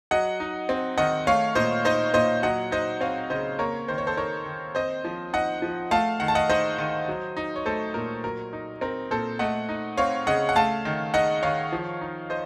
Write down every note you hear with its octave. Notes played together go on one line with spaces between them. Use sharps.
F#3 D#5 F#5
D#4
C4
D#3 D#5 F#5
A3 C#5 F5
A#2 C5 D#5
D#4 C5 D#5
A#2 C5 D#5
F#3 D#5 F#5
D#4 C5 D#5
C4 C#5 F5
C#3 C5 D#5
A#3 A#4 C#5
D#3 C5
C#5
A4 C5
D#4 A#4 C#5
D#3
C4 C5 D#5
F3
D#4 D#5 F#5
F3
A3 F5 A5
D#3 F#5
A5
D#5 F#5
D#4 C5 D#5
D#3
F#3
D#4
C#5
A3 A4 C5
A#2 A#4
F#3 A#4
D#4
C4 A#4
A#2 A4 C5
A3 D#5 F#5
D#4
C4 C#5 F5
C#3 D#5 F#5
F#5
A3 F5 A5
D#3
D#4 D#5 F#5
D#3 C#5 F5
F3
D#4
C5 D#5